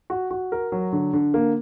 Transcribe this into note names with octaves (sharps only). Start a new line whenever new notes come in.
F#4
F#4
A#4
F#3
D3
D3
A#3